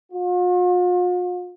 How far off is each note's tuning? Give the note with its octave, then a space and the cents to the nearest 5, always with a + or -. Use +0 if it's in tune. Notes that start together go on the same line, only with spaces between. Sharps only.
F4 +45